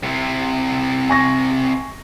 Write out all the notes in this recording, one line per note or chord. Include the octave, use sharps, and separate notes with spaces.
C3 E4
G#5 C#6 A#6